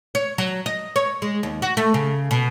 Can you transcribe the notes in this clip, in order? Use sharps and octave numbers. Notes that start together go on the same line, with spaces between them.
C#5
F#3
D#5
C#5
G#3
D#2
F#4
A3
C#3
B2